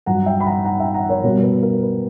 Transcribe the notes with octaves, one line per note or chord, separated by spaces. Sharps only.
G2 F#3 F#5 A#5
E5 G5
B5
F#5 A#5
F#5 A#5
E5 G5
F#5 A#5
A#4 C#5
B2 G3 A#4
B4
A#4
B4